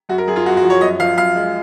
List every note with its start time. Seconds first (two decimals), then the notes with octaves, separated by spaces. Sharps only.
0.09 F#2 F#4
0.18 A#4
0.28 F#2 G#4
0.36 F4
0.46 F#2 F#4
0.57 F#4
0.63 F3
0.70 C#5
0.81 F#2 D#5
1.00 F3 F5
1.17 F#2 F5
1.35 G#3